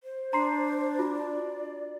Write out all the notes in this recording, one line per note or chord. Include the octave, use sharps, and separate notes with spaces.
C5
D4 A#5 C6 C7
F4 F#4
D5